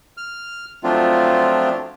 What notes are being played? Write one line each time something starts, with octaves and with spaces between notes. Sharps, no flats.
F6
F3 F#3 A3 C4 D4 F4